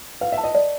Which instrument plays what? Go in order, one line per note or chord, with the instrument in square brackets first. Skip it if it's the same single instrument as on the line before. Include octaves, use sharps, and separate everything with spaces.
[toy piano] B4 [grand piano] F5
[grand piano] E5
[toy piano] A5
[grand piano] D#5
[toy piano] D5